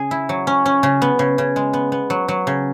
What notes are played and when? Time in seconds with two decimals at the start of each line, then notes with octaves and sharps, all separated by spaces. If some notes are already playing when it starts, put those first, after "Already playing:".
Already playing: C#3 G#4
0.11 E4
0.29 F#3
0.47 C#4
0.66 C#4
0.83 C#3
1.02 B3
1.19 C#3
1.38 C#3
1.56 G#3
1.73 B3
1.92 B3
2.10 F#3
2.28 F#3
2.47 C#3